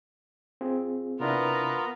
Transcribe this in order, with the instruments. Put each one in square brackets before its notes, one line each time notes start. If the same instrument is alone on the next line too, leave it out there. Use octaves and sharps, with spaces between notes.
[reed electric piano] C4 F4 G#4
[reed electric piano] C3 D4 E4 [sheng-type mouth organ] B3 F4 [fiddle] A#4 B4